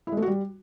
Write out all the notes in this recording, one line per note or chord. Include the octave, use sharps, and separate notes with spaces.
E4
G#3
A3
F#4
G3